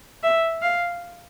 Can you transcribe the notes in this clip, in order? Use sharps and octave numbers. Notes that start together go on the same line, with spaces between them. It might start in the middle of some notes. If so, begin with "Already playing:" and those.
E5
F5